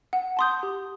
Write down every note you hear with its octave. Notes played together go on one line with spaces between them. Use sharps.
F#5
A5 C6 D#6 G6
G4